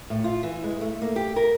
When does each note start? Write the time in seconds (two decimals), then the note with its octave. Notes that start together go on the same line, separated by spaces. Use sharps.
0.10 A2
0.24 F4
0.43 E3
0.64 G#3
0.81 A3
1.01 A#3
1.16 G4
1.36 A#4